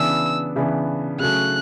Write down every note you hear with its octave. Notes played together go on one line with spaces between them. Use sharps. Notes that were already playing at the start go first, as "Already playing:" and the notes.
Already playing: C#3 E3 B3 D4 E6
C#3 E3 B3 D4
C#3 F#3 A3 C#4 F#6